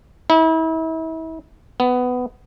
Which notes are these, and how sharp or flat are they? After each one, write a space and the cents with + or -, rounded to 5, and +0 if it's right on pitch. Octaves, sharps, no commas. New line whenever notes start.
E4 -35
B3 +15